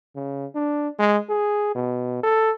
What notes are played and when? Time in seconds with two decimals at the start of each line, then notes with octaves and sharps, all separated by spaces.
0.15 C#3
0.55 D4
1.00 G#3
1.30 G#4
1.75 B2
2.23 A4